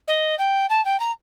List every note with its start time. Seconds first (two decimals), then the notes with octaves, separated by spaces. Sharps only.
0.08 D#5
0.39 G5
0.70 A5
0.85 G5
1.00 A#5